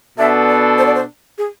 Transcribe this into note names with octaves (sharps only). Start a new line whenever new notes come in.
B2 B3 D4 A4 E5
D5
C5
D5
C5
G#4